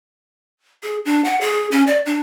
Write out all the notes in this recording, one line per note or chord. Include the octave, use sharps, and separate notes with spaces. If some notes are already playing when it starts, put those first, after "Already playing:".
G#4
D4
F#5
G#4
C#4
D5
D4